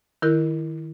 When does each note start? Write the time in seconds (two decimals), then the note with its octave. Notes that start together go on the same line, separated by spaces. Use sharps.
0.22 D#3 E4 A#4 F#6